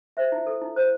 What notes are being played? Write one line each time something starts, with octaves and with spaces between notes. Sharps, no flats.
C5 E5
E4
A4
E4
C5